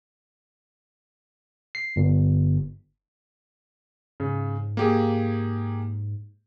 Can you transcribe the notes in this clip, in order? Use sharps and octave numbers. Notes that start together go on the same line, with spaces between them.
C7
G1
G#2 C#3
A#3 G4 G#4